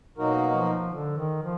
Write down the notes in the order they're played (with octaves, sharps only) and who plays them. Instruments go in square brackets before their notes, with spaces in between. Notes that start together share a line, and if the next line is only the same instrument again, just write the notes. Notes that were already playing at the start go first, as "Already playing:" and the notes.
[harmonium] B2 A#3 D#4 F#4 A#4 [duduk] F#3
[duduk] F3
D3
D#3
F3